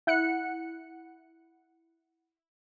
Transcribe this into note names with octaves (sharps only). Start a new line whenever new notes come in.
E4 F#5 F#6 C#7